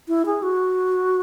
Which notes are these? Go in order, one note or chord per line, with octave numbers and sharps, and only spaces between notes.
E4
G#4
F#4